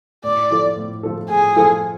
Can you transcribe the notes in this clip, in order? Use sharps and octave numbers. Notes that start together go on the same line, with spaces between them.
A2 D5
F3 A3 F4 A4
A2
F3 A3 F4 A4
A2 G#4
F3 A3 F4 A4